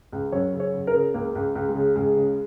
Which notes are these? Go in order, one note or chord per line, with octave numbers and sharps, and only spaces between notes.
C#2
F#2 C#5
C#3
C#5
C#3
A#4
C#3
C#2 A#3
C#2
C#2
G#3
C#3
C#2 G#3
C#3